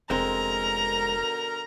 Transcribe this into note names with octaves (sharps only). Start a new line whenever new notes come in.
F1 B2 D3 G#3 C4 A#4 A#5